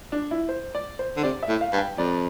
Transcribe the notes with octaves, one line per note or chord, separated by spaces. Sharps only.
D4
E4
C5
D5
C5
D3
C3 D5
E5
A2
F5
G2
G5
F2 D5